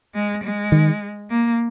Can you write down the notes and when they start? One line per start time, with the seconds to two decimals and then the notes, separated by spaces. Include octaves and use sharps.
0.15 G#3
0.44 G#3
0.72 D#3
1.30 A#3